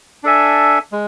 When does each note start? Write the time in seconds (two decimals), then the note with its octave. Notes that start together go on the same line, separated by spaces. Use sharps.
0.24 D4 A4 E5 G#5
0.92 G#3